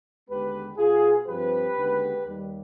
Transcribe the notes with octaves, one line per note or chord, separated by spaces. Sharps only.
D#2 D3 G#3 B3 G4 B4
B2 B3 F4 G#4
G2 F3 C4 G4 B4
D#2 D3 G#3 B3
D#2 D#3 G3